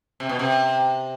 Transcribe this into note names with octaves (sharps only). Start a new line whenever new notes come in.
C3
B2
C3